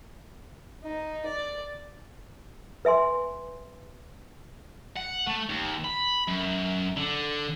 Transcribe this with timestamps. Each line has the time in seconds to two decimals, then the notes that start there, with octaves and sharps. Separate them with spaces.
0.84 D#4
1.26 D5
2.85 B4 E5 G#5 C6
4.97 F#5
5.27 A3
5.49 D#2
5.84 B5
6.28 F#2
6.97 D3